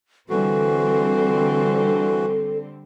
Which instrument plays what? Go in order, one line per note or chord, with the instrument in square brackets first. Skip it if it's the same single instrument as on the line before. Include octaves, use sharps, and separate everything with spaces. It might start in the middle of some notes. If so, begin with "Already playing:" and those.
[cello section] D3 G3 C4 [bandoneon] E3 F#4 [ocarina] A4